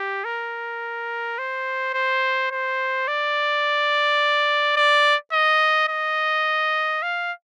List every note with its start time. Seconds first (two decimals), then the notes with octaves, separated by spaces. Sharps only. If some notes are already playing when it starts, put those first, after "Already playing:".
Already playing: G4
0.24 A#4
1.38 C5
1.94 C5
2.51 C5
3.08 D5
4.76 D5
5.32 D#5
5.89 D#5
7.02 F5